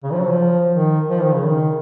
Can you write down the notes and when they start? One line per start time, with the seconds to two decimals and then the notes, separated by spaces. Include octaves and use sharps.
0.04 C#3
0.12 F3
0.21 F#3
0.30 F3
0.74 D#3
1.09 F3
1.22 D#3
1.34 C#3
1.46 D#3